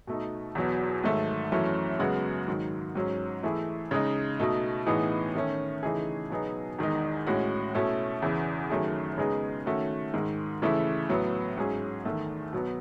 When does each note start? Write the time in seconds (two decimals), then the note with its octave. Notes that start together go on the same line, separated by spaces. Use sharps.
0.07 B2 A3 D#4
0.55 E2 B2 F#3 B3 F#4
1.04 G#2 D#3 F#3 A3
1.52 F#2 E3 A3 C#4
1.99 F#2 C#3 G#3 B3 F#4
2.48 G#2 D#3 F#3
2.95 G#2 F#3 C#4
3.43 E3 A3 E4 G#4
3.91 C#3 G#3 D#4
4.39 B2 A3 D#4
4.87 A2 E3 B3 D#4 G#4
5.35 D#3 A3 C#4
5.83 C#3 E3 A3 D#4 G#4
6.30 B2 F#3 B3 D#4 G#4
6.79 E2 D#3 G#3 D#4
7.27 A2 G#3 C#4 F#4
7.75 B2 A3 C#4 E4
8.22 E2 C#3 E3
8.70 F#2 D#3 A3 C#4 G#4
9.18 C#3 G#3 B3 D#4 G#4
9.66 D#3 A3 C#4 F#4
10.14 G#2 D#3 G#3
10.62 C#3 E3 A3 E4
11.09 A2 F#3 B3
11.57 G#2 F#3 C#4 G#4
12.05 E2 D#3 A3
12.53 B2 F#3 B3